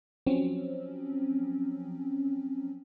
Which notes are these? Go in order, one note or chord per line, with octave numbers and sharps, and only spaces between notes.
F3 F#3 C4 C#4